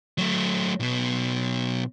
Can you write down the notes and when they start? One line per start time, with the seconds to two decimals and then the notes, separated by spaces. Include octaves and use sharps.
0.18 F#3 A3
0.80 B1 B2